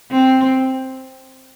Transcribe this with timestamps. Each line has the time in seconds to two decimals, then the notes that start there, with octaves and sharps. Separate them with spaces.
0.11 C4